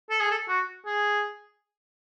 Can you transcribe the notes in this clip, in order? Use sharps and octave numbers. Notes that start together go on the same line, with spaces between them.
A4
G#4
A4
F#4
G#4